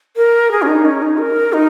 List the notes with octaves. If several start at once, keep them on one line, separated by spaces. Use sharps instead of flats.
A#4
G#4
C#4
D#4
C#4
D#4
A#4
D#4